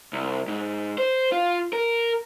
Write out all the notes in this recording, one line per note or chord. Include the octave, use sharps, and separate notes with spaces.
C2
G#2
C5
F4
A#4